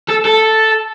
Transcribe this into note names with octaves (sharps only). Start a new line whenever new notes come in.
A4
A4